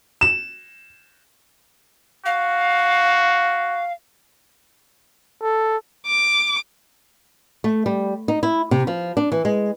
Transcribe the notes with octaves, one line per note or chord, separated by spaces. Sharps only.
E7
F#4 F5
A4
D6
A3
G3
D#4
E4
C3
F3
D4
E3
G#3